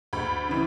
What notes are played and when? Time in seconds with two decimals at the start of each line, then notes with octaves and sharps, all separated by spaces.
0.13 D2 B5
0.48 C#3 E3